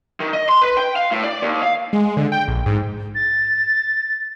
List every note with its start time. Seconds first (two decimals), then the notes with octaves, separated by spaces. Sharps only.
0.20 D#3
0.33 D#5
0.49 C6
0.61 B4
0.77 G5
0.96 F5
1.11 A2
1.24 D5
1.42 D#2
1.63 F5
1.93 G#3
2.17 D3
2.32 G5
2.48 A#1
2.66 G#2
3.15 A6